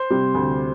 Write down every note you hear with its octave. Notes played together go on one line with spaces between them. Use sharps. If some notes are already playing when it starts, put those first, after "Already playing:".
Already playing: C5
C3 G3
D2